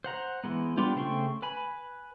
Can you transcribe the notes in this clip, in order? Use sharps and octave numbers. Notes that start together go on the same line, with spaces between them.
C5 F#5 A#5
E3 G#3 B3
G3 B3 D4 F4 G4
C#3 A3 C5 G5 C#6
B4 G#5 B5